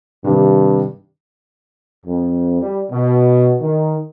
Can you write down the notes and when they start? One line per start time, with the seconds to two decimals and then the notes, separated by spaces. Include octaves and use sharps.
0.24 G2 C3 D#3
2.06 F2
2.62 G3
2.91 B2
3.61 D#3